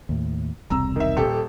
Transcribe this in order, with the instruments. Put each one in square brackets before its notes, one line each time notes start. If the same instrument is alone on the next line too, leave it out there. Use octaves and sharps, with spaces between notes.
[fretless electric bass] D#2 A2
[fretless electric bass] E1 C2 C4 [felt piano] A#5 E6
[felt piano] D#3 E5
D#1 G4 A4